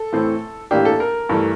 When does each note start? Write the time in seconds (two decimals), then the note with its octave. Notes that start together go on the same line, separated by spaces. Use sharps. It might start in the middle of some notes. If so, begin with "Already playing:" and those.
Already playing: A4
0.13 A2 E3 A3 C4
0.71 A2 E3 A#3 D4 G4
0.85 A4
1.00 A#4
1.29 G2 E3 A3